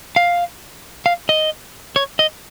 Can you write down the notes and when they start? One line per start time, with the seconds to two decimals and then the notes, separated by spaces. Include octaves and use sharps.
0.16 F5
1.06 F5
1.29 D#5
1.96 C#5
2.19 D#5